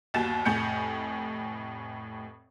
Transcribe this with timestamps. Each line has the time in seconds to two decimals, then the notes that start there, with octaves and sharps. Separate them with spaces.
0.14 G1 D#2 F#4 G#5 A6 E7
0.45 F1 A2 G#5 G6 C#7